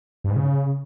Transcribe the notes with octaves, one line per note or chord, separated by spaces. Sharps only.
G2
G#2
C#3